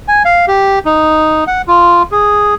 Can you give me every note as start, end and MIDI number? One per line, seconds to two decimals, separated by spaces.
0.08 0.23 80
0.25 0.46 77
0.48 0.79 67
0.85 1.44 63
1.47 1.62 78
1.68 2.03 65
2.12 2.54 68